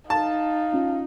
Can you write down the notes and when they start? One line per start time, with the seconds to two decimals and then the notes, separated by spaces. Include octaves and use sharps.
0.10 D#4 F5 A5
0.72 C#4 F4